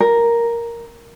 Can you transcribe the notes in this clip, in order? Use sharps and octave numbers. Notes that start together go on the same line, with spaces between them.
A#4